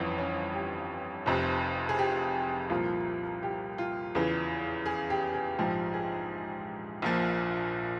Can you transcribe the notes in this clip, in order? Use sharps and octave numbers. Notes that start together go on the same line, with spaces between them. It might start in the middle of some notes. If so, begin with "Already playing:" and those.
Already playing: G1 F2 E3 C#4
C#4
G4
F1 F2 C3
G#4
G4
C2 A#2 F3 F4
G4
F4
E2 C#3 E3
G#4
G4
G#4
A#1 G#2 F3 G4
G#4
A#1 A#2 F3